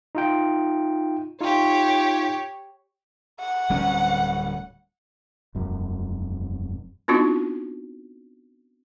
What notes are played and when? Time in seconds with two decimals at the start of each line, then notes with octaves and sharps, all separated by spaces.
0.15 D#4 F4 G5
1.41 D#4 F4 G4 C#5
3.40 F#5
3.70 D1 G3 C#4
5.55 E1 F#2
7.08 B3 C4 D4 D#4 F4 F#4